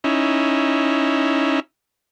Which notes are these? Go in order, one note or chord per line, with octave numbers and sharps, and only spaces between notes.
C#4 D#4 E4